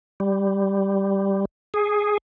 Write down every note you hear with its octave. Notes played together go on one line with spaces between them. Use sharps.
G3
G#4